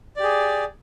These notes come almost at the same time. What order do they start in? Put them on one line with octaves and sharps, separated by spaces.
D5 G4 G#4